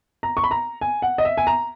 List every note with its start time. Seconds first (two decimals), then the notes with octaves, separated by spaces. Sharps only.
0.23 A#5
0.37 C#6
0.44 B5
0.51 A#5
0.81 G#5
1.02 F#5
1.18 D#5
1.25 E5
1.37 G#5
1.47 A#5